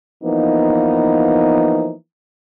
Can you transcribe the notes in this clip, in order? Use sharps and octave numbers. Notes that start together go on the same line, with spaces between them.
E3 F3 A#3 B3 D#4